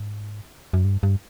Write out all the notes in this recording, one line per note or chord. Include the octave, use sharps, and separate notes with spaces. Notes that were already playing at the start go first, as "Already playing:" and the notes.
Already playing: G#2
F#2
G2
G2